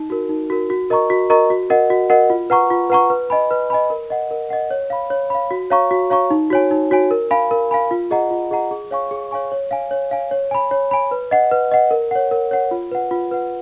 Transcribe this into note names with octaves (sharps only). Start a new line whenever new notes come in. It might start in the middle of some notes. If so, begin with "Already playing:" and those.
Already playing: D#4
F#4 A#4
D#4
F#4 A#4
F#4
A#4 D#5 A#5 C#6
F#4
A#4 D#5 A#5 C#6
F#4
A#4 D#5 F#5
F#4
A#4 D#5 F#5
F4
B4 F#5 A#5 C#6
F4
B4 F#5 A#5 C#6
B4
D#5 G#5 B5
B4
D#5 G#5 B5
A#4
D#5 F#5
A#4
D#5 F#5
C#5
F5 B5
C#5
F5 B5
F#4
C#5 F5 A#5 C#6
F#4
C#5 F5 A#5 C#6
D#4
F#4 C#5 G#5
D#4
F#4 C#5 G#5
A#4
F5 G#5 B5
A#4
F5 G#5 B5
F4
G#4 D#5 F#5 A#5
F4
G#4 D#5 F#5 A#5
G#4
C#5 F5 G#5 C#6
G#4
C#5 F5 G#5 C#6
C#5
F5 G#5
C#5
F5 G#5
C#5
G#5 B5
C#5
G#5 B5
B4
D#5 F#5
B4
D#5 F#5
A#4
C#5 F#5
A#4
C#5 F#5
F4
B4 F#5
F4
B4 F#5